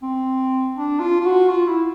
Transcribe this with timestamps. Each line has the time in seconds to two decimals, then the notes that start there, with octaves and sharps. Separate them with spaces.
0.02 C4
0.76 D4
1.00 F4
1.21 F4
1.25 F#4
1.49 F4
1.67 E4